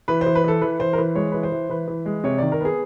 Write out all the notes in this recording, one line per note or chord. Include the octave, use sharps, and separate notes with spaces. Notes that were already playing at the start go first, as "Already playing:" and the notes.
E3 B4
C5
E3
B4
E3 A4
E3 B4
E3 C5
A#4
E3 B4
G#3 C#5
E3 B4
C5
E3
E3 B4
E3
G#3
C3 C#5
D#3 D5
A#4
B3 G#4